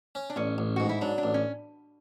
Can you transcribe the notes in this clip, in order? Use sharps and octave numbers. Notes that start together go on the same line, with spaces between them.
C#4
D4
A1 C#4
A1
G#2 F#4
E4
F#3 D4
D4
A1
C#4